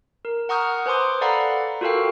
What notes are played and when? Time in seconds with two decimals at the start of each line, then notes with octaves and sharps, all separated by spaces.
0.25 A#4
0.49 F#5 A#5 C#6 D#6 F6 G6
0.86 B4 C5 G#5 C6 D6 D#6
1.21 A4 D5 F5 F#5 A#5 B5
1.81 F4 F#4 A4 A#4 F5 G5